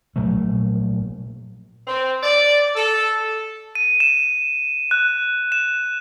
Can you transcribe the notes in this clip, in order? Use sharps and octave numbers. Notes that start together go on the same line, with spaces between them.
A#2 F3 F#3 A3
C4
D5
A4
D#7
E7
F#6
E7